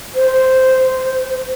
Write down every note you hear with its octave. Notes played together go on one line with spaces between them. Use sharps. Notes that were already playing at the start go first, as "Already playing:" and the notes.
C5